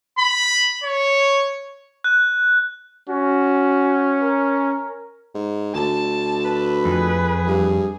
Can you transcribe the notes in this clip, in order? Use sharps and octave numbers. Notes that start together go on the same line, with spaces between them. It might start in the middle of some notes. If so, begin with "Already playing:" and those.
B5
C#5
F#6
C#4 F#4
A#4
G#2
D2 A5
B4
F2 G#4
G2